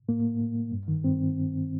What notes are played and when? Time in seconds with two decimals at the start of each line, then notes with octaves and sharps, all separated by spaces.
0.09 A2 A#3
0.41 A2
0.72 G2
0.88 D#3
1.04 G2 C4